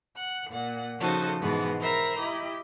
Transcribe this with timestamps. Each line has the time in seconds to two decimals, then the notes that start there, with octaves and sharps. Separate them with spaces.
0.16 F#5 F#6
0.50 A#2 F#5
0.99 C#3 F3 D#4 F#4 A4 C5
1.41 G#2 B2 E3 G#3 B3 F#4
1.80 A#4 C5 E5 A#5 B5
2.19 E4 G4 D#5